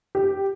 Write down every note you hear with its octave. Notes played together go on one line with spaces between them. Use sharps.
G4